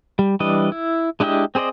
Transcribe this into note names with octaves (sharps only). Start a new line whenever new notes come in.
G3
E3 G3 D4 D#5
E4
G#3 D4 E4 G4 D#5
C4 G#4 C5 D5 D#5